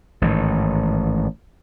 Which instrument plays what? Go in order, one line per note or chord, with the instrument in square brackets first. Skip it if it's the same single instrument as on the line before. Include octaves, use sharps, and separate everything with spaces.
[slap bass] A1 G#2 D#3